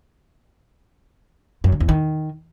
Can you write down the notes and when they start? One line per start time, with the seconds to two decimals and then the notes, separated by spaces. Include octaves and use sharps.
1.64 F#2
1.72 D3
1.80 E2
1.89 D#3